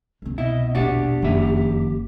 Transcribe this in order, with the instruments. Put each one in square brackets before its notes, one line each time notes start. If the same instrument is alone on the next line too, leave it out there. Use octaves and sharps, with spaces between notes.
[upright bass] C2 C4
[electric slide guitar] B2 [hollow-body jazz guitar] E4 [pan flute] D#5
[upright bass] A#1 E2 [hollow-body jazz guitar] D4 F#4 [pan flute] G4
[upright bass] F#1 [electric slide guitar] F2 D#3 E5